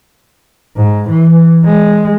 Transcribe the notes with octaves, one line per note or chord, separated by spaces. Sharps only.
G#2
E3
G#3